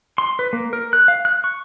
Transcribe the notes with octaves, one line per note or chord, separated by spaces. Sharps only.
C6
B4
A#3
A#4
F#6
F5
F#6
C#6